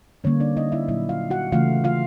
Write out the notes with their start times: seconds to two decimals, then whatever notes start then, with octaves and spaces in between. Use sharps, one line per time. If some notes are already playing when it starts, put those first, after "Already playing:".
0.24 D3 G3 A#3 C#4 C#5
0.40 D4 D5
0.57 D#4 D#5
0.72 E4 E5
0.88 A#2 F#3 A#3 E4 E5
1.09 F4 F5
1.30 F#4 F#5
1.52 C#3 E3 A3 F4 F5
1.84 F4 F5